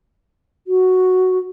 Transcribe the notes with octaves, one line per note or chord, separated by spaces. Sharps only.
F#4